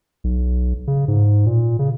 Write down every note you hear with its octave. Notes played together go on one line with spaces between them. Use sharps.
B1
C#3
G#2
A#2
C#3